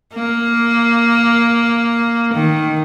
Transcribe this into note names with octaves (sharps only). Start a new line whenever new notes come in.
A#3
D#3